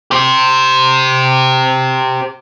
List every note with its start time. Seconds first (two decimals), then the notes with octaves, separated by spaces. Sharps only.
0.11 G4 C5